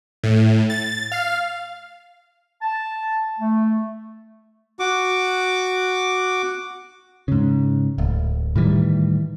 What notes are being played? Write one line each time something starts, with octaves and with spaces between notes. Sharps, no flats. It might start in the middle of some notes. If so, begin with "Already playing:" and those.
A2
A6
F5
A5
A3
F#4 D6
G#2 C#3
D1
A2 D#3 E3 G3